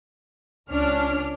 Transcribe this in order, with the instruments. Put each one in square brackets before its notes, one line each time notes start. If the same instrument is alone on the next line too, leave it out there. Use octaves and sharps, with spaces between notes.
[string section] C#2 C#4 D4 F6